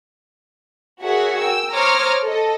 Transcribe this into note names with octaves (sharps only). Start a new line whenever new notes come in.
F#4 G#4 A#4 C#5 E5 F#5
G5 E6
C5 C#5 A#5 D6 D#6 F6
A4 D#5